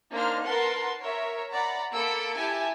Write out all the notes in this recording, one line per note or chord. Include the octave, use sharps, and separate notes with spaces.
A#3 D4 D#4 C5 F6
A#4 B4 F#5 A5 C6
A#4 C#5 E5
D5 F#5 A#5 B5
A#3 A4 B5 E6 C#7 D7
E4 G4 E5 G#5 A5